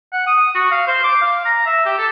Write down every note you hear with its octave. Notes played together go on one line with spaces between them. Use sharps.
F#5
D#6
F#4
F5
C5
D6
F5
A#5
E5
G4
A4